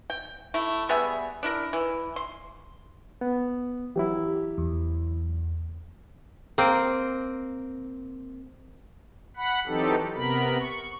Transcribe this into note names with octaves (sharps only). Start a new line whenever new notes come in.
G5
A3 E4
G3 B3 G#4 E5
D4 E4 A#4
E3
C6
B3
E3 F#3 E4 G4
E2
A#3 C4
F#5 B5
E3 F#3 C4 D#4 G4 A4
C3 B3 A#4 B5
C#6